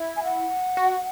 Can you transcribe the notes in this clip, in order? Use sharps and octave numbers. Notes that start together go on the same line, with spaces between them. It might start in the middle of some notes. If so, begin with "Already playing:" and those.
Already playing: E4
G#5
F#5
F#4